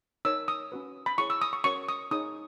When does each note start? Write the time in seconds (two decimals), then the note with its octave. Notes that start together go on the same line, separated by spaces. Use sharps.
0.25 D#4 A#4 C#5 E6
0.48 D#6
0.72 C#4 F#4 B4
1.06 B5
1.18 E4 G#4 C#5 C#6
1.30 E6
1.42 D#6
1.53 C#6
1.64 C#4 F#4 A#4 C#5 C#6
1.89 D#6
2.11 D#4 G#4 C#5 D#6